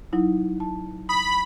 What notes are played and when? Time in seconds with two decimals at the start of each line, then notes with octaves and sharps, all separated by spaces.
0.13 F#3 D#4 E4
0.60 A5
1.09 B5 D#6